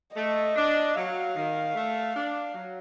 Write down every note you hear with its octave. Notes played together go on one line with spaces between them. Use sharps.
A3 D#5
D4
F#3 F5
D#3
A3
D4
F#3